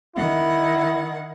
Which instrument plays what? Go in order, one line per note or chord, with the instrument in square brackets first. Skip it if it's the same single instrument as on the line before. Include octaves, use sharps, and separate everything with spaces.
[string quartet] D#3 F#5 [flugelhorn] E4